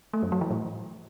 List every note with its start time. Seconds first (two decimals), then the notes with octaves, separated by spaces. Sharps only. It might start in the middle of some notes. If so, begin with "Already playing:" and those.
0.13 A3
0.23 F#2
0.32 F#3
0.41 E3
0.50 A2